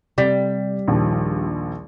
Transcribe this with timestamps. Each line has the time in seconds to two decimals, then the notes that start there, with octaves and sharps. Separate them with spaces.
0.18 C3 G3 A6 B6
0.88 A#1 D#2 F3